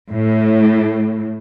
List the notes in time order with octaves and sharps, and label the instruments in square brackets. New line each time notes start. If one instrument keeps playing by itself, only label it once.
[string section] A2